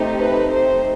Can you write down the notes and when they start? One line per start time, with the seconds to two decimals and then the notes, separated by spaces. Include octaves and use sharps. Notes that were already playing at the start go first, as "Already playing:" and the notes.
Already playing: A3 C4 D#4 G4
0.19 B4
0.50 C5